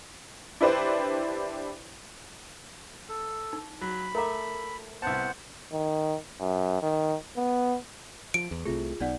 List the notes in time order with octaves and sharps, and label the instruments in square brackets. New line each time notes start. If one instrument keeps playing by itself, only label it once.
[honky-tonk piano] D4 E4 G4 B4 C5 D5
[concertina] A4
[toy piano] D#4
[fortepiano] F#3 [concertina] B5
[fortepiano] A3 E5 [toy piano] A#4 A#5 D6
[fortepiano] C2 A5 [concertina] B3 C5 F#5
[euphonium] D#3
F#2
D#3
B3
[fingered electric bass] F3 [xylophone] D7
[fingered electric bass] E2
[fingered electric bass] C2 C3 A3 [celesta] F4 G#4
[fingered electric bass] B1 B3 [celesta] D#4 D5 F#5